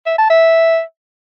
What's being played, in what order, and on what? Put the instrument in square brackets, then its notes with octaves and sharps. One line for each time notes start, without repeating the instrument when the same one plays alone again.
[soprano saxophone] E5
A5
E5